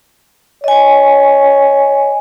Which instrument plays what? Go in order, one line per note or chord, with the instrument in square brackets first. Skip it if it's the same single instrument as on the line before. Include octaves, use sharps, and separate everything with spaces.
[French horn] C#5 [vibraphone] D#5 G#5